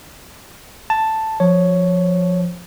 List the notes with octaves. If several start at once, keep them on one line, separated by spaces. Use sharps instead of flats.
A5
F3 C#5